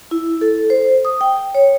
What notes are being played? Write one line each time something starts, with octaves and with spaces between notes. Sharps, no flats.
E4
A4
C5
D#6
G5
C#5